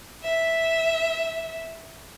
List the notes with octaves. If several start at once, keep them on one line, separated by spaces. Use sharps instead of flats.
E5